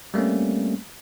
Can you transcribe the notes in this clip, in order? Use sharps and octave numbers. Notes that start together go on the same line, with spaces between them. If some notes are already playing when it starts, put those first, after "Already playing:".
G3 A3 A#3 C4 C#4